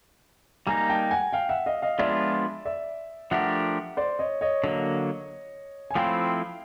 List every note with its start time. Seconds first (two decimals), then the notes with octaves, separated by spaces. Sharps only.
0.67 G3 A#3 D#4 G#5 A#5
0.90 G5 A5
1.11 F#5 G#5
1.33 F5 G5
1.49 E5 F#5
1.66 D#5 F5
1.82 D#5 F5
1.99 F3 G#3 B3 D4 F4 D5 E5
2.65 D5 E5
3.31 F3 A3 D4 G4 A#4 E5 F#5
3.97 C5 D5
4.19 C#5 D#5
4.41 C#5 D#5
4.64 D3 F#3 A#3
5.91 G#5
5.95 F3 A3 C4 E4 F5 G5